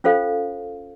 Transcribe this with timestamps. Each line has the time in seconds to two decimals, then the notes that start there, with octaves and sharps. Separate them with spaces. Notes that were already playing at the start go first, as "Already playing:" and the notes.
0.04 C#4 F4 A4 C5 F5